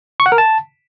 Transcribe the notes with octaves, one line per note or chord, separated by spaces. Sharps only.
C#6
F#5
A#4
A5